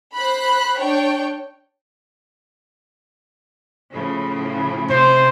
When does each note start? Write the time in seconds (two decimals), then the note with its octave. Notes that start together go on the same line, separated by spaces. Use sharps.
0.16 C5 B5 F#6
0.79 D4 C#5 G5
3.91 A2 C#3 F3
4.90 C3 C5